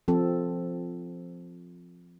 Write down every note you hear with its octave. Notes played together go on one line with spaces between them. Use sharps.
F3 C4 A4